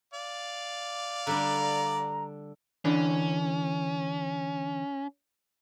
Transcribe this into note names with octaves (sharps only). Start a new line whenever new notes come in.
D5 F5
D3 G3 D4 A#5
D3 E3 C#4 D4